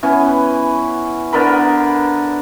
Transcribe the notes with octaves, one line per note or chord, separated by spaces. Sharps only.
E3 B3 C#4
D3 B3 A#4 B5